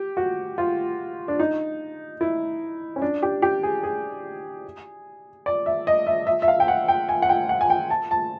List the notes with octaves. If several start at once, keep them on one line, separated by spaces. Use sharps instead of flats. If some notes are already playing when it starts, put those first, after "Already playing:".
Already playing: G4
F#4
F4
D4
D#4
E4
C#4
D4
G4
G4
G#4
G#4
D5
E5
D#5
E5
E5
E5
F5
G5
F#5
G5
G#5
F#5
G5
F#5
G#5
G5
A5
A5